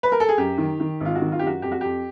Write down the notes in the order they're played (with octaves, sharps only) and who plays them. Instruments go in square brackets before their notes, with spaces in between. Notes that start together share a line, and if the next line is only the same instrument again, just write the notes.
[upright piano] B4
A#4
A4
G#4
F#2 G4
D#3
D#3
G#1 F4
F#4
D#3
F4
F#2 G4
F#4
F2 G4
F#4
F2 G4